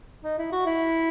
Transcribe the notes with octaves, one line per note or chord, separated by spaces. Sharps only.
D#4
E4
F#4
E4